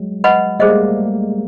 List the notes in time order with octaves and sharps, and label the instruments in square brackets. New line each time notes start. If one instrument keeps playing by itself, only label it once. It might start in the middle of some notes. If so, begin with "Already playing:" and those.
Already playing: [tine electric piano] F#3 G#3
[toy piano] B4 D#5 F#5 B5
[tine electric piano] G3 A3 [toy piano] G#4 C5 D#5
[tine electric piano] G#3 A#3